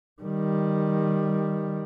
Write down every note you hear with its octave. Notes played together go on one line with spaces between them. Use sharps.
D#3 G3